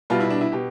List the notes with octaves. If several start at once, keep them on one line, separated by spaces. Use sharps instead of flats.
C2 B2 G3 F4
E4
D4
E4
B2 G4